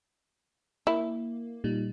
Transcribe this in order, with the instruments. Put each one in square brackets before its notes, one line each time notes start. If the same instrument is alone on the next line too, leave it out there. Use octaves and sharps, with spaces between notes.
[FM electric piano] A#3 [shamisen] E4
[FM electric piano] A#2 G3 D#4